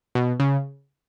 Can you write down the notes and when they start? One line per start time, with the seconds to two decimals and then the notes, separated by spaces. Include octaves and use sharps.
0.15 B2
0.40 C#3